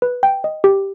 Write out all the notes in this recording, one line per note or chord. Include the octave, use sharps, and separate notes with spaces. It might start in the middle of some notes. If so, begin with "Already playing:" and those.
B4
G5
D#5
G4